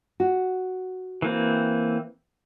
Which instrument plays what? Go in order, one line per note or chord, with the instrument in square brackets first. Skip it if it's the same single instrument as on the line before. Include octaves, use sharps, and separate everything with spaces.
[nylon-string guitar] F#4
[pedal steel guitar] E3 A#3 C4